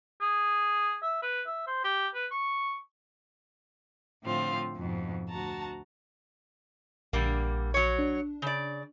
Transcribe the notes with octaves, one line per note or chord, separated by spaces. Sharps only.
G#4
E5
B4
E5
C5
G4
B4
C#6
A2 D3 F3 C4 F4
F2 G#2 B2
D2 F#4 A5 A#5
A#1 D3 G3 A#3
F#3 C#5
D4
C#3 D5